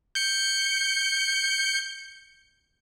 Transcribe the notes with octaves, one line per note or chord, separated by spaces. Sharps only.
G6 C#7